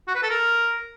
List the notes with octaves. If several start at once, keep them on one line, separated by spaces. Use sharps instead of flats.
F#4
B4
A4
A#4